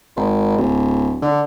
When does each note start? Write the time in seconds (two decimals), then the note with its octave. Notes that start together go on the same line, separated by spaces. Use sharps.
0.16 G#1
0.57 D1
1.22 D3